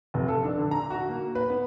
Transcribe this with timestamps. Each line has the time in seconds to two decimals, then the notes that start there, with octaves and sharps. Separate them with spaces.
0.14 F1
0.28 A4
0.43 D4
0.57 D3
0.71 A#5
0.90 F#4
1.09 A#3
1.35 B4
1.50 B3